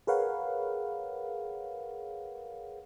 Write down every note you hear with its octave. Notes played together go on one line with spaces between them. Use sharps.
G#4 A#4 B4 C#5 F5 F#5